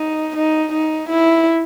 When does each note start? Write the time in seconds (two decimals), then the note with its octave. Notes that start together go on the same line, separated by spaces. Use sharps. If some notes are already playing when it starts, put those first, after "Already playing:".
Already playing: D#4
0.36 D#4
0.72 D#4
1.09 E4